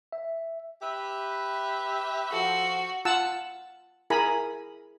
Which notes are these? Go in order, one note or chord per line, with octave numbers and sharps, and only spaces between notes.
E5
G4 B4 E5
F3 F#4 A4
F4 F#5 A5 E6
E4 G#4 A#4 G#5 A#5 B5